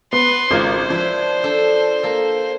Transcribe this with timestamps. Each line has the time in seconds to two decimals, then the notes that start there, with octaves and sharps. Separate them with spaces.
0.13 B3 B4 C6
0.51 G#1 C#3 F4 A#4 C5 G#6
0.90 F3 D4 E4 B4
1.44 D4 A4
2.03 A#3 A4